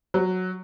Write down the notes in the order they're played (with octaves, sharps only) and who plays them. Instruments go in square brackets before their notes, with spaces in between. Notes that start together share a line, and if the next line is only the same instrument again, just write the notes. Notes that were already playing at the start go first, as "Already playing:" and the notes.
[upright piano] F#3